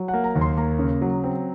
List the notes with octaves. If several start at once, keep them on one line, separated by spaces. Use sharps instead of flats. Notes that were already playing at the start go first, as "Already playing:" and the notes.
Already playing: F#3
F#5
A#3
A#5
D#2
C6
A#3 A#5
C#3
F#3
C4